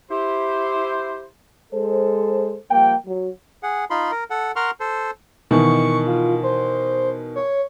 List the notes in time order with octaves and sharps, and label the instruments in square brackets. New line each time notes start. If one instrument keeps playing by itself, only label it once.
[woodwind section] E4 G4 C5
[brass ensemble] G#3 A4 C5
F3 G3 A#3 G5
F#3
[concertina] G#4 F#5
D#4 F4 B5 C6
A#4
A4 F#5
A#4 F#5 C6 C#6 F6
A4 C5
[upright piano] B2 D#3 E3 [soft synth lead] C#6
[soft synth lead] F4
C5
C#5